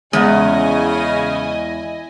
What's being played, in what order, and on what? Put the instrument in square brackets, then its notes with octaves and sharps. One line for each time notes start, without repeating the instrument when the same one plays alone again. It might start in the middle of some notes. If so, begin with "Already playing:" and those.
[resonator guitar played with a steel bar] E2 [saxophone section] C#3 C#4 [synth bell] G#3 F#5 [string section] E4 D#5 G#5